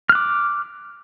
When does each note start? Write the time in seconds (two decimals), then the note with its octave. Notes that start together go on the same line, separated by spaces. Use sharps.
0.09 F6
0.12 F#6
0.15 D6